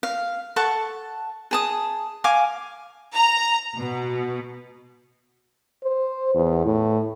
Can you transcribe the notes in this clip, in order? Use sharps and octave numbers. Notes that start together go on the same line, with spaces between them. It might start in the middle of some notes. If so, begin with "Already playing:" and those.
F5
A4 F#5 A5 C#6
G#4 A5 D#6
F5 G#5 D6
A#5
B2
C5
E2
A2